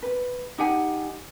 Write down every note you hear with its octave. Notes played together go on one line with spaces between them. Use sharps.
B4
D#4 G4 F#5 G#5